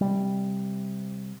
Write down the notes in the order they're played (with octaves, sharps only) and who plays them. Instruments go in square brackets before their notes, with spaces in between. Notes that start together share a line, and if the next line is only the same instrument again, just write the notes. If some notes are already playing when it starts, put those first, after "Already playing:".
[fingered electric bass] C3 G3